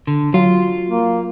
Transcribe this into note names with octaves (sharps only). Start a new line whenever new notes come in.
D3
F#3 F4
A#3